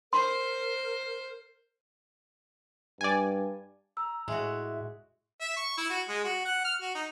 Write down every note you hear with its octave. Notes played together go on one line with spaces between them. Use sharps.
A#4 C5 C6
G2 D5 G#5
A#5 E6
A2 G#3 F#4 E5
E5
C#6
E4
F#4
G#3
F#4
F#5
F6
F#4
D#4